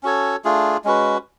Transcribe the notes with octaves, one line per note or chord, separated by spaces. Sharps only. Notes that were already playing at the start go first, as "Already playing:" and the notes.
C#4 F#4 A4 C#5
A3 D4 F4 G#4
G#3 C#4 F#4 B4